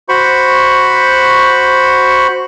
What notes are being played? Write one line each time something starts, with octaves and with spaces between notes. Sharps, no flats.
F#4 C5 B5 C#6